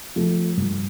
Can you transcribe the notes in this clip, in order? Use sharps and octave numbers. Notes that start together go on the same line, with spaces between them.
F3 A3
G2